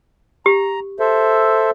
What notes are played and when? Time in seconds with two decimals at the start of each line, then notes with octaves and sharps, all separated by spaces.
0.46 G4 A#5
1.00 A4 C5 E5